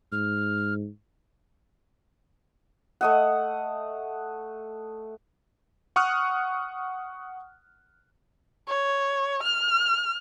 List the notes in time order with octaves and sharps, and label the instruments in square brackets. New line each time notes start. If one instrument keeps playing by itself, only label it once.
[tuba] G#2 [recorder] F6
[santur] A3 D#5 F#5
[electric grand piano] F#5 C#6 D#6 F6 F#6
[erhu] C#5
F6